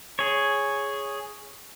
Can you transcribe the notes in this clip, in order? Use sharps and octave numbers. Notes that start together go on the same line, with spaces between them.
G#4 C#5